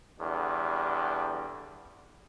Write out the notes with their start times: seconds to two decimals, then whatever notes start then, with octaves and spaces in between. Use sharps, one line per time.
0.20 E2 D3 G3